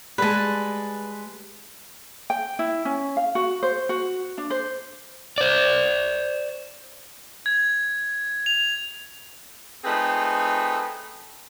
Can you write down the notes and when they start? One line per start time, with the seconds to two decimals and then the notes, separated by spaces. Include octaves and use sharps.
0.18 G3 G#3 B4 A5
2.30 G5
2.59 E4
2.85 C#4
3.17 F5
3.35 F#4
3.63 C5
3.89 F#4
4.38 D4
4.50 C5
5.38 C5 D5
7.46 G#6
8.46 F7
9.84 A3 C4 D#4 F4 G#4 B4